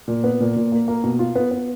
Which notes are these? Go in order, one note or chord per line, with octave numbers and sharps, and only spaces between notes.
A#2
B3
A#2
A#2
A#3
A#3
B2
F4
B3
B3